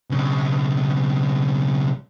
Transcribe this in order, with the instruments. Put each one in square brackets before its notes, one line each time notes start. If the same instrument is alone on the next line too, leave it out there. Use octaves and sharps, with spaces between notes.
[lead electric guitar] B1 C#3